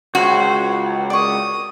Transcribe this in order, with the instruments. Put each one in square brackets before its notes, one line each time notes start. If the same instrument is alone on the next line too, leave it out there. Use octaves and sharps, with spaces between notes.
[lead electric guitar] C#2 [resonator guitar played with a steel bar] F#4 [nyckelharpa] C5
[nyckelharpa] A#4 D#6 [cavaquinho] D5 C#6